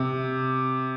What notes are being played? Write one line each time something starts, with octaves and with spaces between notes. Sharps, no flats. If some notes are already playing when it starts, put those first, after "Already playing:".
Already playing: C3